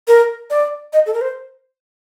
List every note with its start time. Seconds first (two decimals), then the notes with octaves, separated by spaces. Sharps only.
0.08 A#4
0.50 D5
0.93 D#5
1.06 A4
1.14 A#4
1.21 C5